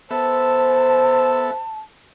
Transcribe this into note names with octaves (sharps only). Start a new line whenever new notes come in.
B3 A4 C5 E5 A5